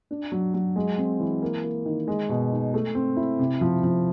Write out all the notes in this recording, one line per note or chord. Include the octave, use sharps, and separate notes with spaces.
D4
F#3
F#3
G#3
C4
E3
A#3
A#3
D#3
G#3
B2
D#4
A3
C4
E4
C3
F3
F3